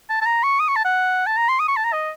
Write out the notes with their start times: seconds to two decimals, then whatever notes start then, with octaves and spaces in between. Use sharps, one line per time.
0.10 A5
0.22 A5
0.26 A#5
0.43 C#6
0.60 D#6
0.68 C#6
0.76 A5
0.85 F#5
1.26 A5
1.37 A#5
1.49 C6
1.60 D#6
1.68 C#6
1.77 A5
1.84 A#5
1.93 D#5